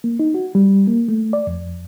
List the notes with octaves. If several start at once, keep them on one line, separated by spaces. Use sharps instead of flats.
A#3
D#4
F#4
G3
A#3
A3
D5
F2